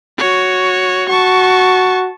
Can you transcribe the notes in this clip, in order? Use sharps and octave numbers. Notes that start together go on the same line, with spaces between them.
F#4 C#5
F#4 A5 C#6